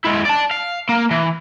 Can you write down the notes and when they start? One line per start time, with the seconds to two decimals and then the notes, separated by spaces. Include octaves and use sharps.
0.05 G#3 E4
0.25 D5 A5
0.51 F5
0.89 A#3
1.11 E3